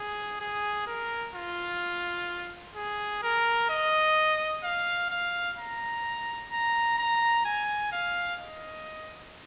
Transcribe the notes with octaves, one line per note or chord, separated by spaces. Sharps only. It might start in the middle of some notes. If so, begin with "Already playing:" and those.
Already playing: G#4
G#4
A#4
F4
G#4
A#4
D#5
F5
F5
A#5
A#5
A#5
G#5
F5
D#5